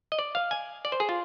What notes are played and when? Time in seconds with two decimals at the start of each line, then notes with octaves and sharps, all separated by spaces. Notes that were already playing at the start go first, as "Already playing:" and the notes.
0.12 D#5
0.19 D5
0.35 F5
0.51 G#5
0.85 D5
0.92 C5
1.00 G#4
1.09 F4